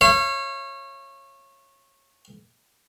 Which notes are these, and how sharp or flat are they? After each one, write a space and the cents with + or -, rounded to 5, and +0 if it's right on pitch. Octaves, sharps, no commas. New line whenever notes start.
C#5 -20 F5 -40